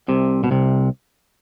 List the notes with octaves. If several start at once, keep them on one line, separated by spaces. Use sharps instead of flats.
C2 C3
B2
C2 C3